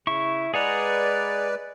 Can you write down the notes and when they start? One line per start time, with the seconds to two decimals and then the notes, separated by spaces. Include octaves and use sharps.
0.07 C#3 E4 C#6
0.54 G#3 G#4 B4 D5 F#5 A#5